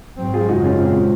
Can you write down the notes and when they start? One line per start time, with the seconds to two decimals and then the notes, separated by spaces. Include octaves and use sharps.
0.18 G#2 F#3 C4
0.34 F4 G#4
0.49 F#2 C#3 G#3 D#4 F#4
0.64 C#4 F4
0.79 A#2 G#3 C4